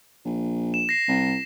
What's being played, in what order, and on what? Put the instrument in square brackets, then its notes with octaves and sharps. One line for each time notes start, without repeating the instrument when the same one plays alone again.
[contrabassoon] A#1
[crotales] E7
A#6 C7
[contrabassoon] C2